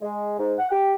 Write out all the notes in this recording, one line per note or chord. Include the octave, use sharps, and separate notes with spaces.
G#3
G#2
F#5
G4